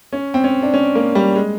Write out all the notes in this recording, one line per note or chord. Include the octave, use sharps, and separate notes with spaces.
C#4
C4
C#4
D4
C#4
A#3
G3
G#3